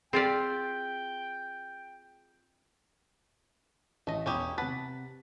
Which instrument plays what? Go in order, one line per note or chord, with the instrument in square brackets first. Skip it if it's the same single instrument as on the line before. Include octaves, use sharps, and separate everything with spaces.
[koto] C4 F4 D5 [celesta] G#4 B6 [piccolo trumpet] G5
[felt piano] A1 [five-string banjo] A3 D#5
[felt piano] E1 D#6 [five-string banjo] C#4 E4 G4
[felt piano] C3 B6 [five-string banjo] B4 F#5 A5